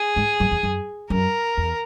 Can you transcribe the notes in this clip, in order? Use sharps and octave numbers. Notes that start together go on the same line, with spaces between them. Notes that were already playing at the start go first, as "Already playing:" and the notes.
Already playing: G#4
G#2
F#2
E2
F#2
F#2 A#4
E2